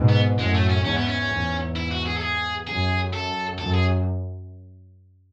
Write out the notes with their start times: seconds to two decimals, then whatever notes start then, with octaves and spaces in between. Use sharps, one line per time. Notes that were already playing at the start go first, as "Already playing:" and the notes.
Already playing: G#2 B2
0.09 B3
0.38 F#2 A2 G#3
0.54 A3
0.69 C#4
0.84 E2 G#2 C#4
0.97 B3
1.08 C#4
1.31 E2 G#2
1.76 E4
1.91 F#4
2.06 G#4
2.17 A4
2.22 G#4
2.67 F#2 G#4
3.13 A4
3.58 F#2 A4
3.74 G#4